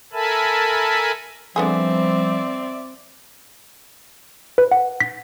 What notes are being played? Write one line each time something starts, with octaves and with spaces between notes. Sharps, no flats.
A4 A#4 E5 G#5 A5 B5
D3 F3 G3 B3 C4 G#4 D5 E5
B4
F#5
B6